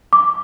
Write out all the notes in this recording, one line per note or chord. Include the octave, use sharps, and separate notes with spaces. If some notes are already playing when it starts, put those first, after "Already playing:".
D6